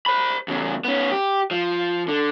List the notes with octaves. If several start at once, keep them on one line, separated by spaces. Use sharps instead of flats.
C5 B5
E2 C#3
B3 C#4
G4
F3
D3